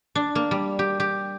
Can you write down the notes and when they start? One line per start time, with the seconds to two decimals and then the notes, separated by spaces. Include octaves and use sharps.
0.15 D4
0.35 A#3
0.51 G3
0.79 G4
1.00 G4